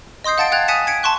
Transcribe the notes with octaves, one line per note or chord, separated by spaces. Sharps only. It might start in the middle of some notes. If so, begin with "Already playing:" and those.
D#5 C6 D#6 G6 C7
F5 F#5 A5 A6 C#7 D7
F5 G5 F#6 G#6 A6 F7
G#5 D#6 F#6 B6 C#7 E7
G#6 B6 C#7 D7
A5 C6 C#6 F#6